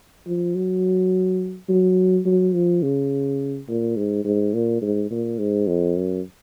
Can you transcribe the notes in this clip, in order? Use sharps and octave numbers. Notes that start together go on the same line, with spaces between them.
F3
F#3
F#3
F#3
F3
C#3
A#2
G#2
G#2
A#2
G#2
A#2
G#2
F2
F#2